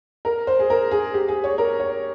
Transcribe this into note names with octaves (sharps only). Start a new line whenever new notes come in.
A#4
C5
G#4
A#4
G#4
G4
G#4
C#5
A#4
C#5